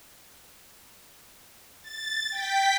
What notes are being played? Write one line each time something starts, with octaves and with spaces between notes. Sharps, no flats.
A6
G5 B6